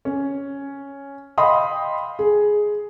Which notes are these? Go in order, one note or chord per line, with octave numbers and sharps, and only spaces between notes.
C#4
D#5 F5 G5 B5 C6 D#6
G#4